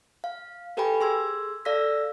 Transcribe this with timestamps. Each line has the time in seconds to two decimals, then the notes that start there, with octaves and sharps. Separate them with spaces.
0.24 F5
0.77 G4 A4 B4 G5 G#5 B5
1.01 G#4 C6 E6 G#6
1.65 A4 D5 F5 E6 A#6 B6